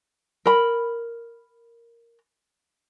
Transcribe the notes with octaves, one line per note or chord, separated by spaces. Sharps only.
A#4 B5